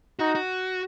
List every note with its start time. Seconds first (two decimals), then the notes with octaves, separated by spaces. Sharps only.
0.19 D#4 F#4
0.35 F#4